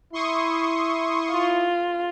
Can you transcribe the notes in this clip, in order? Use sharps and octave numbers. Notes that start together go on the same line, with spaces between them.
E4 C6 C#6 D#6
F4